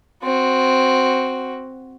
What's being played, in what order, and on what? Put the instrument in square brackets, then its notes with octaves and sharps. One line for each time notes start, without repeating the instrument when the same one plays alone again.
[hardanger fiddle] C4 F#4